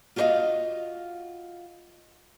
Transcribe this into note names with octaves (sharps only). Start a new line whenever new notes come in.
F4 F#4 A4 D5 D#5 F5